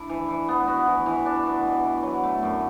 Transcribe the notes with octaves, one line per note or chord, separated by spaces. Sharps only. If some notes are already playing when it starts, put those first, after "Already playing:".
Already playing: D4 E4
E3
E3
B3
F#4
E3
E3
D4
B3
B2
E4
F#3
A3
F#2